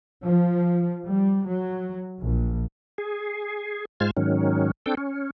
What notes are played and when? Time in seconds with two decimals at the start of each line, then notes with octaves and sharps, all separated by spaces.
0.23 F3
1.05 G3
1.46 F#3
2.22 A#1
2.98 G#4
4.00 G#2 G#3 F4 C5 F6 G#6
4.17 G#2 D#3 F#3 C#4
4.86 C4 D4 A4 G5
4.97 C#4